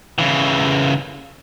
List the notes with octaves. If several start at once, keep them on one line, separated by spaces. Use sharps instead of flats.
C#3 E3